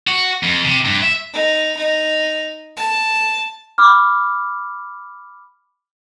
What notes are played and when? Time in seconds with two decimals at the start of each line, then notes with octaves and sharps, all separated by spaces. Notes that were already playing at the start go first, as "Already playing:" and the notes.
0.07 F#4
0.43 F2
0.64 C3
0.85 G2
1.02 E5
1.33 D#4
1.77 D#4
2.77 A5
3.78 B5 D6 F6